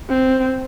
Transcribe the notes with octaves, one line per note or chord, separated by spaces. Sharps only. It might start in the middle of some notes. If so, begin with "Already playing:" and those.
C4